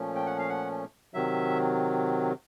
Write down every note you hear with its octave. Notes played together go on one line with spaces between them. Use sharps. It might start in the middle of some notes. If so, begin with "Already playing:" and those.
Already playing: A#2 F3 A3 C#4
G5
F#5
F5
F#5
C3 D#3 F#3 E5